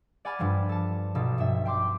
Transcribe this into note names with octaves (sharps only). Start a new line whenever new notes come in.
D5 F#5 G#5 B5 F6 A6
G2 F3 G3
A4 A5
B1 B2 F3 A4
G2 F3 E5
G5 C6 D6